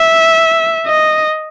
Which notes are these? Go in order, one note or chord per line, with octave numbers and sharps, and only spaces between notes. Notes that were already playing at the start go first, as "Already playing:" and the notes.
Already playing: E5
D#5